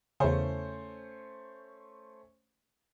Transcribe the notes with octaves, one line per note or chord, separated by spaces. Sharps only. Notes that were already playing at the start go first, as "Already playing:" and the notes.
E2 C#3 A3 C#4 C5